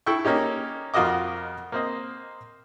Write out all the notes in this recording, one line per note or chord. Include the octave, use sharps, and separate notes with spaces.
E4 A4 G5 C#6
A#3 C#4 D#4 G4
F2 F4 F#4 A#4 D#5 D6
A#3 C4 D#5